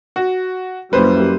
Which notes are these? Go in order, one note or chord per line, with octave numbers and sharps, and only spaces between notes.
F#4
F#2 G3 A#3 E4 B4 C5